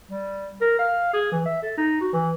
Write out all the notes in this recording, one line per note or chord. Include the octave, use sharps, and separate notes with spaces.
G3
A#4
F5
G#4
E3
E5
A4
D#4
F#4
E3